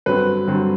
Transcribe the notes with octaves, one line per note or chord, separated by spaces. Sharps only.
G2 D3 F#3 C4 B4
G2 D3 F#3 C4